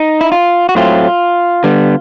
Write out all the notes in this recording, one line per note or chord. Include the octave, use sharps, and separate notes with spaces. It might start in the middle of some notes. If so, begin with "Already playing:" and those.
Already playing: D#4
E4
F4
F#4
A2 F#3 A3 C4 F4
D3 G3 B3